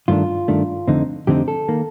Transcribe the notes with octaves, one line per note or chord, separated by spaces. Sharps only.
G2 D#3 A3 D4 F4
G2 D#3 A3 D4
F2 D3 A3 C4 D#4
F2 D3 A3 C4 D#4 G4
A4
D#3 A#3